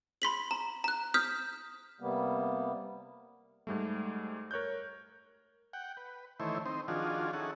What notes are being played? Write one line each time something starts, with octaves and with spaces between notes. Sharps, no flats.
B5 C6 B6 F#7
A#5
A#5 F#6
D#6 F6 G6 B6
C3 G3 A#3 B3
G#2 G3 A3
A#4 C#5 F#6 G6
F#5 G5
B4
D#3 E3 A3 E4 C5 C#5
C4 D#4 C5
D#3 F3 D4 F4 F#4 G#4
C#4 D#4 E4 G#4 A4 F#5